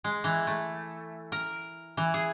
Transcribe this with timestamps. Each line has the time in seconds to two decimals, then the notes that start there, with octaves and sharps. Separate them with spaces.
0.04 G#3
0.24 E3
0.47 A3
1.32 A#4
1.97 E3
2.14 G#4